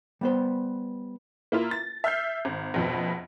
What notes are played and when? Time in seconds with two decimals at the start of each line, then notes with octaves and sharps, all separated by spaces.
0.21 G3 B3 C5
1.52 A#3 E4 F4
1.71 A6
2.04 E5 F6 G6 C7
2.45 G#1
2.74 A#1 F2 B2